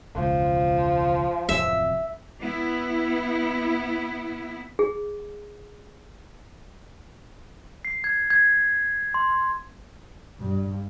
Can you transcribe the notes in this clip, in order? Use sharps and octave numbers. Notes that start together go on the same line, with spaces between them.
E1 C#2 F3
D1 F2 C3 E5
B3 E4
G#4
C7
G#6
G#6
C6
G2